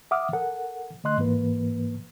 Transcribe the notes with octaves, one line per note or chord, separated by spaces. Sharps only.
E5 F#5 D6 D#6 F6
A4 A#4 F#5
D3 A3 D#5 C6 F#6
G#2 E3 A#3 B4